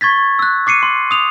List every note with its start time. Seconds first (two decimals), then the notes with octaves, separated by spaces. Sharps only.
0.01 C#6 G#6 A6 B6
0.39 E6 F#6
0.67 D6 C7 C#7 D#7
0.83 C6
1.11 D#6 F7